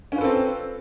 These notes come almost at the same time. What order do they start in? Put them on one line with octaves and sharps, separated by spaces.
C#4 F4 B4 A4 C4